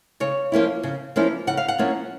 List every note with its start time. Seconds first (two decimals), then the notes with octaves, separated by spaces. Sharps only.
0.20 C#3 C#5
0.52 F3 A#3 C#4 E4
0.83 C#3
1.16 F3 A#3 C#4 E4
1.47 C#3 F#5
1.57 F5
1.68 F#5
1.78 F3 A#3 C#4 E4